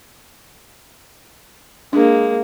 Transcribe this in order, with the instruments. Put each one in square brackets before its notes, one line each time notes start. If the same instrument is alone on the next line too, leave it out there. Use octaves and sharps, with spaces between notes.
[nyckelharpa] G#3 A#3 [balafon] D4